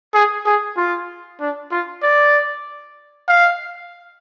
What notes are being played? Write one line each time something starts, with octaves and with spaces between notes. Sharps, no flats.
G#4
G#4
F4
D4
F4
D5
F5